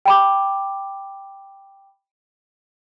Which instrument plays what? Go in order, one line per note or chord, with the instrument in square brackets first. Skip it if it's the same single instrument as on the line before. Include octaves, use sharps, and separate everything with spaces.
[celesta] G5 B5 D6